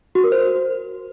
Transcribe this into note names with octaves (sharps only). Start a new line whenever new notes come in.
F#4
A#4
C5